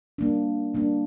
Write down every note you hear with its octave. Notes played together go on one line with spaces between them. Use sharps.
G3 A#3 D4
G3 A#3 D4